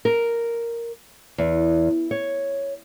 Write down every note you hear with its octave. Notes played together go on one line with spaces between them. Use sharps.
A#4
E2
C#5